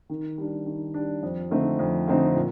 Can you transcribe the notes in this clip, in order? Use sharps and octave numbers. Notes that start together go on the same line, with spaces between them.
D#3
G3 D4
D#3
G3 D4
F2
D3 A3 C4 D#4
F2
D3 A3 C4 D#4
A#2